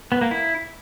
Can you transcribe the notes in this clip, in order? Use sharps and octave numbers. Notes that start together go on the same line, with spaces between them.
B3
A#3
E4